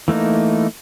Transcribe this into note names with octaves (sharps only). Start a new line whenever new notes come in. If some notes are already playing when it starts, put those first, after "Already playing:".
E3 A3 A#3 D#4